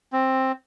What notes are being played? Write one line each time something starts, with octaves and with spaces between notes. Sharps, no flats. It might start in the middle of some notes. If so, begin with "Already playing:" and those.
C4